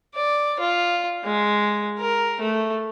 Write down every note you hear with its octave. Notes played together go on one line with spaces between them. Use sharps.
D5
F4
G#3
A#4
A3